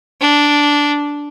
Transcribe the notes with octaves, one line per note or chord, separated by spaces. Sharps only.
D4